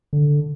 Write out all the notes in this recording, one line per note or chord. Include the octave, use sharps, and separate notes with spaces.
D3